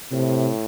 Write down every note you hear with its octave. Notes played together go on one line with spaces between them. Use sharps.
A2 C3